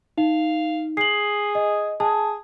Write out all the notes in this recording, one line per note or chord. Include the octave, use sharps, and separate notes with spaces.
D#4 F5
G#4 C7 F#7
D#5
G#4 A5